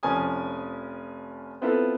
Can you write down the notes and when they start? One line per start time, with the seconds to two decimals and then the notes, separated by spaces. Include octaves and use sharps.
0.03 F1 F3 C#4 G#5 D#6
1.62 B3 C4 E4 F4 A4 B4